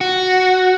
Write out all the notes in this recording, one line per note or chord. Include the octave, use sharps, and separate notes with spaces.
F#4